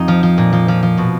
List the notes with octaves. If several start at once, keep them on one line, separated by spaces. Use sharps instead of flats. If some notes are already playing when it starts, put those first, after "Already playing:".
Already playing: F2 D#4
F3
F3
A#2
F3
F3
F3
B2